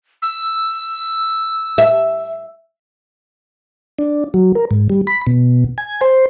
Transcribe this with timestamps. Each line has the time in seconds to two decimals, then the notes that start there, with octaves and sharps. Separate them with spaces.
0.22 E6
1.78 E5
3.99 D4
4.34 F#3
4.55 A#4
4.71 G#2
4.90 G3
5.07 B5
5.27 B2
5.78 G#5
6.01 C5